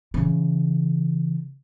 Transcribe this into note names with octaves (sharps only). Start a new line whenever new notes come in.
C#3 E3